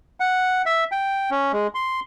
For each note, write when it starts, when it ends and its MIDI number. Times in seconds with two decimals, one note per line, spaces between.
0.20 0.62 78
0.66 0.84 76
0.92 1.30 79
1.31 1.52 61
1.52 1.67 56
1.75 2.00 84